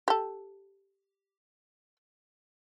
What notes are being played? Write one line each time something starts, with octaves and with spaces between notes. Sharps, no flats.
G4 A4